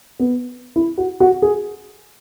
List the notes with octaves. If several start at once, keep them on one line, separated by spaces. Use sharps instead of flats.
B3
E4
F#4
F#4
G#4